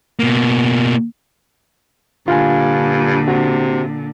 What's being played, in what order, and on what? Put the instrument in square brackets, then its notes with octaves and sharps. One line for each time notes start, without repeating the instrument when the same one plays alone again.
[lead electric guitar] B2 A#3
[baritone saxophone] G2 [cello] A#2 D3 [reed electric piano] F4 F5 G#5
[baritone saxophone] C3 [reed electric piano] F#4